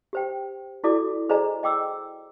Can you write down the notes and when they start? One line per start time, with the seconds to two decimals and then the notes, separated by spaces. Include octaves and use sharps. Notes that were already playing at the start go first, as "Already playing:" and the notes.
0.13 G4 C5 G5
0.84 E4 F#4 A4 D5 D6
1.29 G#4 C5 D5 D#5 G#5 A#5
1.63 D#5 G5 D6 E6